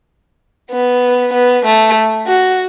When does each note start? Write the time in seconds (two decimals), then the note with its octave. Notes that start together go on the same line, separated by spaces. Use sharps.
0.71 B3
1.34 B3
1.65 A3
2.27 F#4